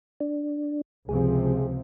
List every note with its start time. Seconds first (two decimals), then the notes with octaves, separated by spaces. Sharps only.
0.20 D4
1.09 C#2 C3 F3 G#4